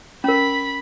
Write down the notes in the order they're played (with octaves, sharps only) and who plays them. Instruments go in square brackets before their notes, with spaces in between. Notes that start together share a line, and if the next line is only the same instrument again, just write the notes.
[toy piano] C#4 A#4 [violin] B5 B6